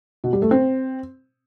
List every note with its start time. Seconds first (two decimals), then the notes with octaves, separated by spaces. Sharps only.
0.24 B2
0.33 G3
0.42 A3
0.51 C4